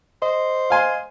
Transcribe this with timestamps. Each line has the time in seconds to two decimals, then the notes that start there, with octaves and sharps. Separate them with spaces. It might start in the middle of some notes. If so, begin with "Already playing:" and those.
0.22 C5 D#5
0.70 F5 G#5 C6